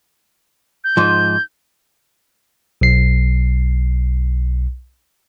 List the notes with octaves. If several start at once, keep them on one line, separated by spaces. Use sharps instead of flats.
G6
G#2 F3
B1 C7